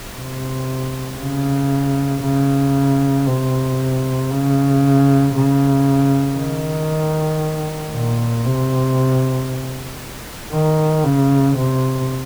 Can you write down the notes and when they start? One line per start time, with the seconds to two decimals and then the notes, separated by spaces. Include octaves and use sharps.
0.16 C3
1.19 C#3
2.22 C#3
3.27 C3
4.31 C#3
5.34 C#3
6.37 D#3
7.93 A#2
8.45 C3
10.53 D#3
11.04 C#3
11.57 C3